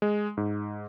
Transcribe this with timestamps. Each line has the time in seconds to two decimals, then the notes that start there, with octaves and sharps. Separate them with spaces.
0.02 G#3
0.37 G#2